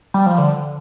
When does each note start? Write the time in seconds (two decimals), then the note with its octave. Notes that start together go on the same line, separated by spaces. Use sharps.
0.14 G3
0.26 F3
0.38 D3